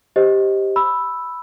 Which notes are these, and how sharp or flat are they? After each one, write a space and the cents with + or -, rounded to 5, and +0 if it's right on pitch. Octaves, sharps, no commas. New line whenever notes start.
G4 +0 C5 +0 D#5 +10
B5 +0 E6 +0